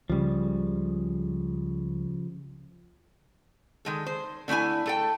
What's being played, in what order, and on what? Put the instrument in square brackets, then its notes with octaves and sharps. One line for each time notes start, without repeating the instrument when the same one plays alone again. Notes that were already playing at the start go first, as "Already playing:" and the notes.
[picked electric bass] C#2 G3 [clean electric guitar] C#3 F3
[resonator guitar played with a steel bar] D#3 G#3 A4
C5
D3 A3 D4 E4 G#5
A3 A4 G5